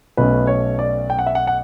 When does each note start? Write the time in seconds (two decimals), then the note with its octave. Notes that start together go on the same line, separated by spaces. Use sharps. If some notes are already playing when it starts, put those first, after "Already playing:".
0.17 B1 B2 A3 C#4 B4
0.47 C#5
0.79 D5
1.10 G5
1.19 F#5
1.27 E5
1.35 F#5
1.47 F#5